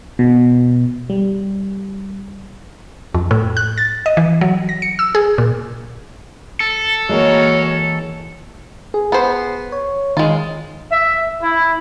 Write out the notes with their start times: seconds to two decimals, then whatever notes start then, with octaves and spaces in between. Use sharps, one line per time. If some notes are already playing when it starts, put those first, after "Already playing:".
0.19 B2
1.10 G3
3.14 F2
3.31 A2
3.57 F#6
3.78 A6
4.06 D#5
4.17 E3
4.41 F#3
4.69 A#6
4.82 C#7
4.99 E6
5.15 G#4
5.38 A#2
6.60 A4
7.09 E3 G#3 A#3 F#4 A#4 C#5
8.94 G#4
9.12 B3 C5
9.72 C#5
10.17 D#3 G#3 F4
10.92 E5
11.42 E4